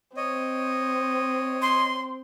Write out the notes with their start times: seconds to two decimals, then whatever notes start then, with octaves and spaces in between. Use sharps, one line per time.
0.17 C4 C#5 D#5
1.62 C6